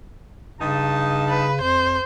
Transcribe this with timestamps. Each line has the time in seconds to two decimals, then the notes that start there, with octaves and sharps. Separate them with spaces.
0.61 G2 C#3 D#4 A5
1.29 B4
1.61 F2 C5